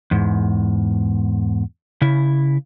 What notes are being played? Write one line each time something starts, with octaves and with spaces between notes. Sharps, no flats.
E2 G#2
C#3 E4